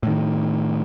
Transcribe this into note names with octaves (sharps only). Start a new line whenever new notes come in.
A2 D#3